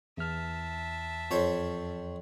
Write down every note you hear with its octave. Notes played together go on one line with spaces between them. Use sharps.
E2 E5 A5 F6
F2 C5 C#5